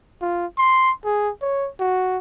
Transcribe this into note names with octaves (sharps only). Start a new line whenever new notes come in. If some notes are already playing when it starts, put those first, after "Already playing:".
F4
C6
G#4
C#5
F#4